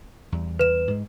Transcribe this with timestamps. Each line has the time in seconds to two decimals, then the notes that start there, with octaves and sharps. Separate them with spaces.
0.32 E2 G3
0.59 B4 E7
0.87 G#2 G#3